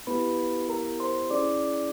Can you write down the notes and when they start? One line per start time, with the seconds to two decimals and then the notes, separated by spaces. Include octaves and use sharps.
0.07 B3 E4 G4 B4 B5
0.69 A#4 A#5
1.00 C5 C6
1.30 C#4 E4 G#4 D5 D6